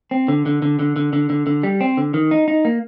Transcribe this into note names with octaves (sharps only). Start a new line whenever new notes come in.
C4
D3
D3
D3
D3
D3
D3
D3
D3
G3
C4
D3
D#3
D#4
D#4
A#3